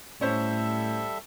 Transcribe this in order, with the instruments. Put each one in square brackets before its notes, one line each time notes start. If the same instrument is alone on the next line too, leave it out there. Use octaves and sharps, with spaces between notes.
[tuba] A2 [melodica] G3 A4 E5 [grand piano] C#4 C5